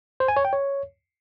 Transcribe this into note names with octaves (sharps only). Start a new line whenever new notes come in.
C5
G#5
C#5
G5
C#5